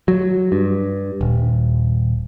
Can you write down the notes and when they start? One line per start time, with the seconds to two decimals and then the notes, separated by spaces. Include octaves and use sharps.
0.08 F#3
0.52 G2
1.21 D#1